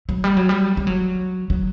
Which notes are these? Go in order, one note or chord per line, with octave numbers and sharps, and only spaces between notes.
F#3
G3
F#3
G3
G3
F#3
F#3